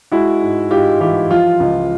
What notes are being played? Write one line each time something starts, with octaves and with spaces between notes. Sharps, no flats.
G#3 E4 F#4
G#2
G#2 F4 G4
E3 F4 G4
F3 F4
C#2